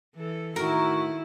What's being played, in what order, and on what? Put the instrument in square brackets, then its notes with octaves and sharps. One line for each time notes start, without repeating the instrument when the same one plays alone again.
[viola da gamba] E3 A4
[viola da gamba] A2 D#3 E4 [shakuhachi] F#4 [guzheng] A#4